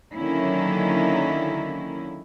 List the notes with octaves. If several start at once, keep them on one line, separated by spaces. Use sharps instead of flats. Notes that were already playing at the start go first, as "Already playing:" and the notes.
D3 D#3 F#3 A#3 C#4 E4